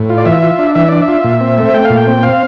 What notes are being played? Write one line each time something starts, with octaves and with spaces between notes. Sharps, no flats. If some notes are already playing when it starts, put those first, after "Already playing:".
Already playing: A2
F4
D5
E3 E5
F4
D4
E3 E5
D4 D5
E5
F4
A#2
C4
A3
A3 G5
F5
A#2
G5
C4
C4 F5